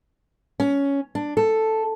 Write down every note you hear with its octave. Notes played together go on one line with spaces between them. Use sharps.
C#4
D4
A4